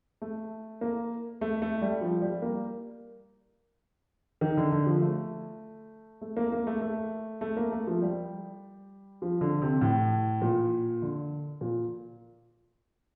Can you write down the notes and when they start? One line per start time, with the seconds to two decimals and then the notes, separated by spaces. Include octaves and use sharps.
0.22 A3
0.81 A#3
1.41 A3
1.62 A3
1.82 G3
2.01 F3
2.22 G3
2.42 A#3
4.41 D#3
4.57 D3
4.72 D3
4.86 F3
5.02 A3
6.21 A3
6.37 A#3
6.52 A#3
6.67 A3
6.81 A3
7.41 A3
7.57 A#3
7.71 A3
7.87 F3
8.02 G3
9.22 F3
9.41 D3
9.62 C3
9.81 A2
10.42 A#2
11.02 D3
11.61 A#2